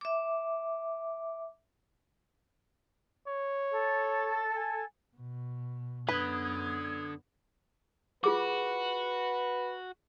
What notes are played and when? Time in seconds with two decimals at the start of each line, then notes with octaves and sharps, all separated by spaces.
0.01 E5 D6
3.28 C#5
3.72 A4
4.56 G#5
5.16 B2
6.08 F#2 D3 B3 B4 D#6 G#6
8.24 F4 F#4 G#4 B4 D6